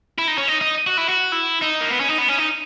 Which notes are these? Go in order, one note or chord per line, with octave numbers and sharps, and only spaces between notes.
E4
D#4
C#4
D#4
D#4
F#4
E4
F#4
E4
D#4
A#3
B3
C#4
D#4
B3
C#4
D#4